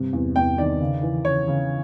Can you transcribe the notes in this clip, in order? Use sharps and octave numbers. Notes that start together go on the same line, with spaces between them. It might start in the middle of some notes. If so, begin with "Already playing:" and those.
Already playing: G2 C3
E2
E2 G5
D#3 D5
C#3
E3
C#3 C#5
C#3